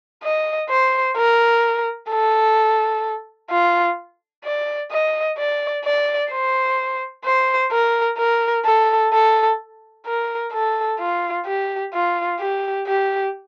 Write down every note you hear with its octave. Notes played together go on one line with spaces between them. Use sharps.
D#5
C5
A#4
A4
F4
D5
D#5
D5
D5
C5
C5
A#4
A#4
A4
A4
A#4
A4
F4
G4
F4
G4
G4